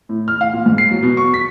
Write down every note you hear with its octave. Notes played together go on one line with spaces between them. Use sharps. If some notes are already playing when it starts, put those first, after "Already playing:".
A2
F6
F5
A#2
G#2
C7
F#3
B2
C#6
B6